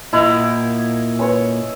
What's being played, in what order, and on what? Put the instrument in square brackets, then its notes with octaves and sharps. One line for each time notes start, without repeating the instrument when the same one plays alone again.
[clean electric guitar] A#2 F#5 A#5 [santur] E4 D#5
[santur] C#4 B4 C#5